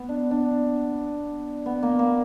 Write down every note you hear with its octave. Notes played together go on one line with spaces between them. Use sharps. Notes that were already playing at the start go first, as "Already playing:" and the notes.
Already playing: B3
D4
D4
B3
A#3
A#3